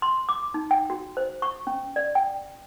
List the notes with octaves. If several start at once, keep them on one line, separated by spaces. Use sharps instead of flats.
C6
D6
D#4
G5
F#4
C5
C#6
C#4
D5
G5